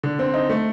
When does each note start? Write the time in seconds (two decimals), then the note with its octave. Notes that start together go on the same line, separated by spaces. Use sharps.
0.03 D3
0.19 C4
0.34 D#4
0.49 A3